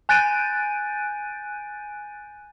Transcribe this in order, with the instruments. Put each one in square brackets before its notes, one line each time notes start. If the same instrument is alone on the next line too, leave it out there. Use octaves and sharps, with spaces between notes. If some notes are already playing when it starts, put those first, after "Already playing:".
[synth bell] G#5 F#6 G6 A6 D7 D#7